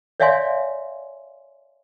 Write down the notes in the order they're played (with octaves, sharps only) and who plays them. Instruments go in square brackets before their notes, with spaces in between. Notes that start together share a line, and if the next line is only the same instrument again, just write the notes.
[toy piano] C#5 D5 E5 F5 G#5 C6